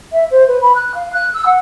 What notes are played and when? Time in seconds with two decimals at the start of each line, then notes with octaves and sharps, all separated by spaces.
0.12 E5
0.31 C5
0.48 B4
0.62 B5
0.75 F#6
0.95 F5
1.13 F#6
1.34 E6
1.46 F#5